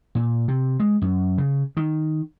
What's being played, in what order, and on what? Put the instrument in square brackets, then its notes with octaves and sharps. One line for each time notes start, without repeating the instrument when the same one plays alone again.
[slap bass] A#2
C3
G#3
F#2
C#3
D#3